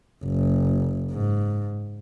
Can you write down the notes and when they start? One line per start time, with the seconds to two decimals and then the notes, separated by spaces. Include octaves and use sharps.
0.25 F#1
1.11 G#2